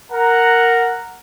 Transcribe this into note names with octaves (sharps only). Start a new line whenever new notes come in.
A#4 F#5 A#5